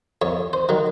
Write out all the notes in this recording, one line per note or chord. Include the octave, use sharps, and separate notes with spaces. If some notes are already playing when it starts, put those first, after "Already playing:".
F2 C#5
C5
D#3 F#3